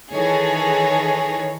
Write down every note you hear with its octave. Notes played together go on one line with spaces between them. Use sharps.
D#3 E3 G#4 A4 C#5 A#6